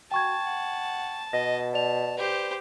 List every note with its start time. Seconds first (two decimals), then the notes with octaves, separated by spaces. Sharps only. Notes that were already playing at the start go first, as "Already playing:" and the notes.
0.11 F#4 G5 A5 C#6 G#6
0.45 F#5
1.33 B2 D#5 A#6
1.74 D5 A5 F7
2.17 G4 B4 C5